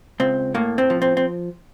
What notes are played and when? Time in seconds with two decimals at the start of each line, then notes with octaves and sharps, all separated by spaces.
0.20 C#2 C4
0.54 A2 A#3
0.78 C4
0.90 F3
1.02 C4
1.17 C4